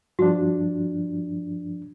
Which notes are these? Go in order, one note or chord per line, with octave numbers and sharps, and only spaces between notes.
G2 F3 D4 F#4